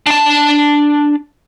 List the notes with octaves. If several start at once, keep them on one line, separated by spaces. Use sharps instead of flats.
D4 A5